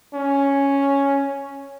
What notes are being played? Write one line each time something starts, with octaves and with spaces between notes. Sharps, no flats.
C#4